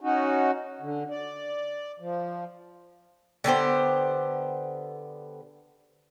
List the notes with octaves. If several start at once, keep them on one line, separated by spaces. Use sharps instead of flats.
C#4 D#4 F#4
D3
D5
F3
D3 B3 G4 C5